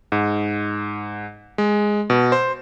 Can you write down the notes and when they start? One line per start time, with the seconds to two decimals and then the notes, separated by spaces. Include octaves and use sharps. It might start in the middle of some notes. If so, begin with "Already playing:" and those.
0.12 G#2
1.58 G#3
2.10 B2
2.32 C5